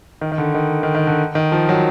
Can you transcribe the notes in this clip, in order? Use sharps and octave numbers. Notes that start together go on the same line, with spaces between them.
D#3
D#3
D3
D#3
D#3
D#3
D3
D#3
F3
F#3